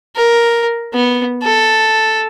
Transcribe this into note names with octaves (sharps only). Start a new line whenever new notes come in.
A#4
B3
A4